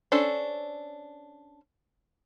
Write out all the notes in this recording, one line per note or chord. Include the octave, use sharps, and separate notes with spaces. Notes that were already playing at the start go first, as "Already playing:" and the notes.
C#4 D4 A4 C5